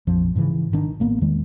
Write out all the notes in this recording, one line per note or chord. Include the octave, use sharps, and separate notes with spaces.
A#1 F2 F3
G#2 C#3 E3
G#1 D#3 D4
A1 A#3 B3
E2 D#3 G#3